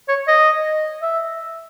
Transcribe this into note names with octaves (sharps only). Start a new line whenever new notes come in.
C#5
D#5
E5